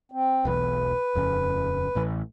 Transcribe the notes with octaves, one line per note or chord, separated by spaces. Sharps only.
C4
E1 B1 E2 B4
D#1 F2 C#3
A1 A2 E3